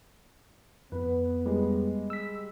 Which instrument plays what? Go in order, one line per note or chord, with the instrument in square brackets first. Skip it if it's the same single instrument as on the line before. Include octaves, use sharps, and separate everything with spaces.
[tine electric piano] F2 [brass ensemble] B3 [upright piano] B4
[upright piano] G3 G#3
[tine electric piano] E6 B6